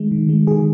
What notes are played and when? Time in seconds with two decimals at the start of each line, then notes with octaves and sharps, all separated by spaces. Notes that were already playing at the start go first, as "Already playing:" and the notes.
Already playing: D#3 G#3
0.12 D#3
0.29 G#3
0.47 D#3 G#4